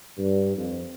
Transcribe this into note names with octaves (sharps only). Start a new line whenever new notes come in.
G2
F2